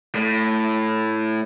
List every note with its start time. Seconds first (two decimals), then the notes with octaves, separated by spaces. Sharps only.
0.15 A2